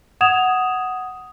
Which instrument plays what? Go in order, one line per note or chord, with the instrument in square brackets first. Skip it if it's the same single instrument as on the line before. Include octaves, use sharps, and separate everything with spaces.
[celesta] F#5 D#6 G#6 E7 F7